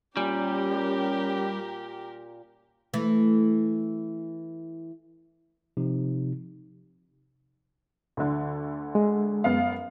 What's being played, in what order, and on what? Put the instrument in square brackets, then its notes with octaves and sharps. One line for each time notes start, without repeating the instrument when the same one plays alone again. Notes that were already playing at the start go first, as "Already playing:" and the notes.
[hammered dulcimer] A#2 [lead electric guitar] G3 [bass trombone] C#4 [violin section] G4 A#4
[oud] E3 A3
[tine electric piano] C3 F3 D#4
[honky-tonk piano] D2 D3
[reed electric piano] G#3
[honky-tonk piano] F#2 B3 F5